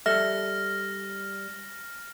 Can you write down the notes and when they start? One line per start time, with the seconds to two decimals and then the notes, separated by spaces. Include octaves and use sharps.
0.06 G3 A4 E5 F6 A#6